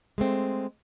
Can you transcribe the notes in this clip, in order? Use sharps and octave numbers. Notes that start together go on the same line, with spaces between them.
G#3 A3 C4